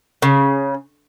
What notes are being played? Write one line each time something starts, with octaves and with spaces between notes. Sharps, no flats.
C#3